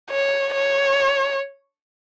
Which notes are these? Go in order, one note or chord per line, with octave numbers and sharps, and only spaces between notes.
C#5
C#5